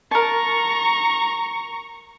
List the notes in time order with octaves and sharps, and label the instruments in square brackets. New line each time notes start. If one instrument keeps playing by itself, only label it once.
[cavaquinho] A#4 A5 [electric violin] A#5 C#6